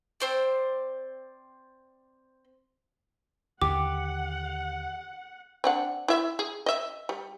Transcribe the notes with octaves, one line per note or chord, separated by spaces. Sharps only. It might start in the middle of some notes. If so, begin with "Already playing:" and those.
C4 C5 D5
D#2 D3 D#3 G4 F#5 D6
C4 D4 F#5
E4 E5
G#4
D#5 E5
G3